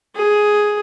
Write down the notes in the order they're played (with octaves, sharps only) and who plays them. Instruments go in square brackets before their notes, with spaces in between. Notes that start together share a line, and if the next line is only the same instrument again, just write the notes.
[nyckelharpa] G#4